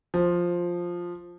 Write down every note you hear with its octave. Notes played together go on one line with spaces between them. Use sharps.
F3